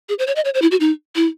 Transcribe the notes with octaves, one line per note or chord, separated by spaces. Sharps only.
G#4
C5
C#5
D#5
C#5
C5
E4
F#4
D#4
E4